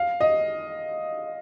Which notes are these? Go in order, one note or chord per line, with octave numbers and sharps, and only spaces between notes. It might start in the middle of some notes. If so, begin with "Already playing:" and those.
Already playing: F5
D#5